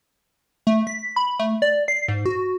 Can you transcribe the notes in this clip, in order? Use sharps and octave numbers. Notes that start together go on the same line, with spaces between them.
A3
B6
B5
A3
D5
C7
G#2
F#4